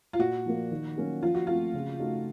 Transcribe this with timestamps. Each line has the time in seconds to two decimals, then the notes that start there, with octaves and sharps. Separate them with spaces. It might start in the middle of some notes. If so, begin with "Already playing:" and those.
0.13 F4
0.19 A#2 F#4
0.46 F3 A#3
0.72 D#3
0.97 F#3 A#3 C#4
1.22 F3 F4
1.35 F#4
1.47 A3 C4 F4 F#4
1.74 C#3
1.99 A3 D#4 F#4